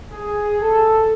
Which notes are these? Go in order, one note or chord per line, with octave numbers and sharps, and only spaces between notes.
G#4
A4